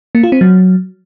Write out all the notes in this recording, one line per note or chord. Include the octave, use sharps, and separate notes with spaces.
A#3
F4
C4
F#3